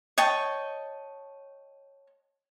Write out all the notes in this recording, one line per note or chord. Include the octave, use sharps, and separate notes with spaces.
C#5 D#5 G5 A5